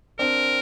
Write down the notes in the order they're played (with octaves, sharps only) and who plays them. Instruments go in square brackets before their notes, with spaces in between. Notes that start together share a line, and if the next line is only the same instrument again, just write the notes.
[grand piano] C4 D4 [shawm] A#4